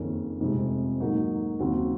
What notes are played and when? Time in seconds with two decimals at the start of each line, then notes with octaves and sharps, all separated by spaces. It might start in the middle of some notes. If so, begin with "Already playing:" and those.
Already playing: F#1 F2 D#3 A#3 C#4
0.41 F1 F2 C3 F3 G#3
1.00 G#2 F#3 A#3 D#4 F#4
1.59 D#2 C#3 F#3 C4 F#4